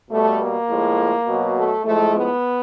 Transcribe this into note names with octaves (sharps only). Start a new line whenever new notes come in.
B2 G3 A3
A#3
A2 F3 G#3
B2 F#3
A3
A2 F3 G#3 A3
B3